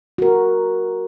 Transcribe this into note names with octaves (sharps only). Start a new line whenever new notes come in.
F#4 A#4